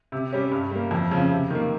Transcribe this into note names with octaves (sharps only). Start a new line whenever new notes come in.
C3
G3 C#4 G4
G2
G3 A#3
F2
C#3 F3 C4
C3
D#3 A#3